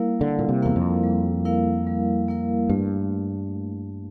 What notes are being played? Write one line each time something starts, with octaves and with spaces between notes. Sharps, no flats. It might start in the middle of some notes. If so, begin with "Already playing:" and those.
Already playing: G3 A#3 E4 A#4 F5
D3 G3
A#2
C3
E2 A#3 E4 A#4 F5
F2
G3
A#3 E4 A#4 F5
G3
A#3 E4 A#4 F5
G2 A3